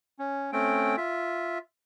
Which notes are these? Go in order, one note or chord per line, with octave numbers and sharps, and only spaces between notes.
C#4
A3 C4 C#4 G5
F4 E5